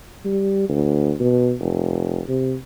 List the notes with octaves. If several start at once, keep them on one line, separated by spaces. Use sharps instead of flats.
G3
D2
B2
F1
C3